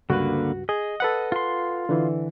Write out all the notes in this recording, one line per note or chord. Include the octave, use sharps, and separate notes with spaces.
C#2 G2 D3 A#3 F#4 B4
G#4 D#5
A4 B4 F#5
F4 C6
D3 E3